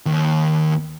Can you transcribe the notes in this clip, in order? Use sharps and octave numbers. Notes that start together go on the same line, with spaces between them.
D#2